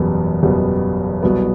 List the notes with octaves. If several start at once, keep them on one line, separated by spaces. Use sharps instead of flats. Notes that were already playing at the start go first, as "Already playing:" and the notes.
Already playing: F#1 E2 B2 G3 B3
F#1 E2 B2 G3 B3
C2 B2 F#3 B3 F#4